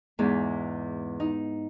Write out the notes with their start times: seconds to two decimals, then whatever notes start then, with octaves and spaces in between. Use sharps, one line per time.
0.19 E2 G#2
1.20 D#4